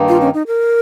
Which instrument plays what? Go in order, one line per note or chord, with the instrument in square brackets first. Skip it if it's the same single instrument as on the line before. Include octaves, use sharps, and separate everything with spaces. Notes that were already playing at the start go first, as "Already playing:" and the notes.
Already playing: [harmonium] G2 D#3 A#3 D#4
[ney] F4
C#4
D#4
A#4